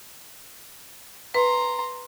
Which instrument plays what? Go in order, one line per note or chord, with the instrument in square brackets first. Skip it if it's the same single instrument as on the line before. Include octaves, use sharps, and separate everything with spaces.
[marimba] B4 [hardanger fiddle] A#5 C6